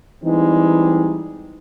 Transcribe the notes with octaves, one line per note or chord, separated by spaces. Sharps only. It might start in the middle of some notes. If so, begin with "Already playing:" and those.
E3 G3 G#3 C4 D#4